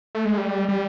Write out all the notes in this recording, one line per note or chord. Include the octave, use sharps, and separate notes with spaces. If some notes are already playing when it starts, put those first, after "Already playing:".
A3
G#3
G3
G3